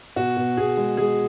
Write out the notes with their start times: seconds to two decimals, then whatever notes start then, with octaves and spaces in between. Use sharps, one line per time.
0.16 B2 F#4
0.37 B2
0.57 B2 G#4
0.77 G#3
0.97 G#3 G#4